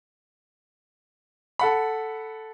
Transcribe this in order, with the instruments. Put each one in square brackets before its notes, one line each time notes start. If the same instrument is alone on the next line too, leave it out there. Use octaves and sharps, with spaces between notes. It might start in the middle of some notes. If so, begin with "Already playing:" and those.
[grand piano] A4 F#5 B5